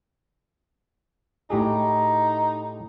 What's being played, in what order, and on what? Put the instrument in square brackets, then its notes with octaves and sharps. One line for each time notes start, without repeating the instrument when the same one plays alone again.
[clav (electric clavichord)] A2 G4 G#4 [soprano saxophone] D#4